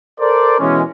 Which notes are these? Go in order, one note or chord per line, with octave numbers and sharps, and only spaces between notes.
A4 A#4 C5 D5
B2 E3 G#3 C#4